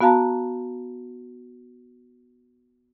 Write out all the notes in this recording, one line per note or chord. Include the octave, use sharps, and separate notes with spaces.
B3 F#4 F5 A5 A#5